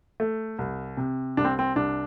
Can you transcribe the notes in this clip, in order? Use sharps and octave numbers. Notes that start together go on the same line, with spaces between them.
A3
C2
C3
C2 D4
C4
C4
C2 D4